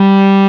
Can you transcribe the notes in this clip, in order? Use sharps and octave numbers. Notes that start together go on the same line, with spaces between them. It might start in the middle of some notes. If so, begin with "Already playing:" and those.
Already playing: G3